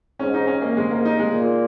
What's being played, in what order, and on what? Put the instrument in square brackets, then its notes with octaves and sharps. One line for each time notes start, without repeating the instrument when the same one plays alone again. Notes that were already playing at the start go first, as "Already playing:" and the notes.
[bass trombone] G#2 [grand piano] C#4
[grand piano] D#4
C#4
A#3
[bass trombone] G#2 [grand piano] G#3
[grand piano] A#3
D#4
G#3
[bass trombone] A#2